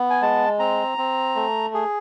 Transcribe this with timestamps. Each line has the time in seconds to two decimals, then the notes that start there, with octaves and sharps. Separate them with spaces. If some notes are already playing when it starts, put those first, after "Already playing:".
Already playing: B3
0.10 G#5
0.21 G#3 A5
0.59 C4 A#5
0.98 C4
1.36 A3
1.74 G#4